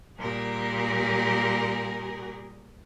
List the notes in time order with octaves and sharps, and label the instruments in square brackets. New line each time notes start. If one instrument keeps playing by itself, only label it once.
[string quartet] A#2 G3 G4 G#4 A#4